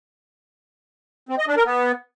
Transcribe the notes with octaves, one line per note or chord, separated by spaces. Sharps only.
C4
D#5
D4
A#4
B3